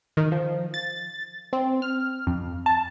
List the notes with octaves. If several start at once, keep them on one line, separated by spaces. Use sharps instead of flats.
D#3
F3
A6
C4
F6
F2
A5